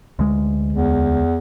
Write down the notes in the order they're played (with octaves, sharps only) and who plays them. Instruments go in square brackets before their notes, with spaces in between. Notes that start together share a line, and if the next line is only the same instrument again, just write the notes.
[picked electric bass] D2 G#3
[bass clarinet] E2